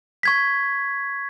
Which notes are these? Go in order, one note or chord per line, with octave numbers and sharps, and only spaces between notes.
C#6 G#6 B6